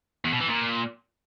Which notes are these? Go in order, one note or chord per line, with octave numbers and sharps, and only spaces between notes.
E2
B2
E3
A#2